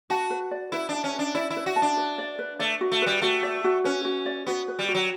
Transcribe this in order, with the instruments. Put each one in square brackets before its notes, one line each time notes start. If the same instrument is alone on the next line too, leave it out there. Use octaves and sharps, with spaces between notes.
[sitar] F#4 [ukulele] A5
[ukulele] B4
D5
[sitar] E4 [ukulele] B4
[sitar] D4 [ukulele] A5
[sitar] C#4
[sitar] D4 [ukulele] B4
[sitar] E4 [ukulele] D5
[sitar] E4
[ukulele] B4
[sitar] F#4
[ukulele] A5
[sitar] D4
[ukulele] B4
D5
B4
[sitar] A3 [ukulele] D5
[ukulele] F#4
[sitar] A3
[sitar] G3 [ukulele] B4
[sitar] A3 [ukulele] F#4
[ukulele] D5
F#4
[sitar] C#4 [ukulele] B4
[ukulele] F#4
D5
[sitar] B3 [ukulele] F#4
[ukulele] B4
[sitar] G3
[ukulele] F#4
[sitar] F#3